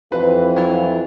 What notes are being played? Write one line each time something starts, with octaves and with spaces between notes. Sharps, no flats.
F2 E3 C4 B4
F#3 E4 F4